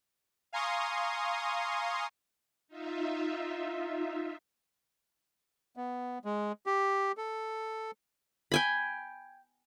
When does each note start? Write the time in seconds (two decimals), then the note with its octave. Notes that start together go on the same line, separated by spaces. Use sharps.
0.53 F5 G#5 A#5 C6 C#6 D#6
2.68 D#4 F4 E5
5.77 B3
6.25 G#3
6.66 G4
7.17 A4
8.52 G5 G#5 B5